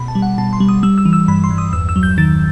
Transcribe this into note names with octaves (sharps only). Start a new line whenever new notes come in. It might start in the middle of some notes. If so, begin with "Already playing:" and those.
Already playing: B2 B5
A5
G3
F#5
B2 A5
C6
G3
D#6
G3 E6
E6
E3
E6
G2 B5
C6
G2
D#6
E2 E6
E6
F#3
G6
D#3 A6